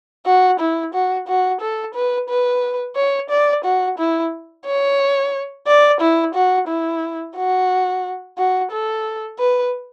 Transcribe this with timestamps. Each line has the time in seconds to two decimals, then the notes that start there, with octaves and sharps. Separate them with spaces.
0.26 F#4
0.60 E4
0.93 F#4
1.28 F#4
1.61 A4
1.94 B4
2.29 B4
2.96 C#5
3.30 D5
3.64 F#4
3.98 E4
4.65 C#5
5.67 D5
6.00 E4
6.34 F#4
6.68 E4
7.36 F#4
8.38 F#4
8.71 A4
9.39 B4